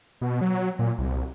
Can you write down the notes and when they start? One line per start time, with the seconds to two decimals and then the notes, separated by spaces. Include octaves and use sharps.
0.21 B2
0.41 F#3
0.79 A#2
0.99 C2